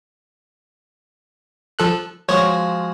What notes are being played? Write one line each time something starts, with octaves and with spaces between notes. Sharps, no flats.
F3 A4 F#6
F3 G#3 F#4 C#5